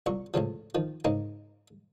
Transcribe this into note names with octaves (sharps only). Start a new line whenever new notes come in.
C2 A#2 C#6
C#2 A2 C#3 F3
D#3 F3
G#2 C#3 A#3 D#4